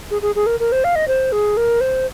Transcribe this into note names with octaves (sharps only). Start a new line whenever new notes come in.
G#4
G#4
G#4
A#4
A#4
C5
F5
D#5
C5
G#4
A#4
C5